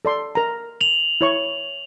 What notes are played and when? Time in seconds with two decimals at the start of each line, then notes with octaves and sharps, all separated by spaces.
0.05 A4 D5 C6
0.35 A#4 A#5
0.81 F7 F#7
1.21 E4 C#5 C#6